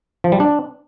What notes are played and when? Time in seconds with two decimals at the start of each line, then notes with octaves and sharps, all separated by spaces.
0.24 F3
0.32 G3
0.40 D4